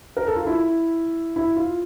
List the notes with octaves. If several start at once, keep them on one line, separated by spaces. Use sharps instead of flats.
A#4
A4
F4
E4
E4
F4